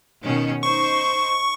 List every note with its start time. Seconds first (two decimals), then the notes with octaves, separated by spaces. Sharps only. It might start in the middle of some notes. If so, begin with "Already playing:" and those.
0.24 B2 D#3 C#4
0.63 D#4 C5 C#6